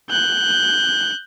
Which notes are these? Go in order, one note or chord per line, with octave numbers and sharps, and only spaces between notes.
F#6 G6